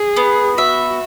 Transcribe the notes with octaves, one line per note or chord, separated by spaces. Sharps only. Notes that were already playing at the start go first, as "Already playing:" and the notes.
Already playing: G#4
B3
F#4 E5